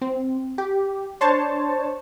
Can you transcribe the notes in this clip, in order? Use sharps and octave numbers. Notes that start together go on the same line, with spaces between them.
C4
G4
D4 C5 C#5 A5